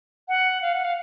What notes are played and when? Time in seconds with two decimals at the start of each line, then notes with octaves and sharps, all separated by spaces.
0.28 F#5
0.62 F5
0.73 F#5
0.85 F5